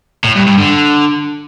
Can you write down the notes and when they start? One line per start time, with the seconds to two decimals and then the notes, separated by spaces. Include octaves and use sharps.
0.24 A2
0.35 G2
0.46 G2
0.57 D3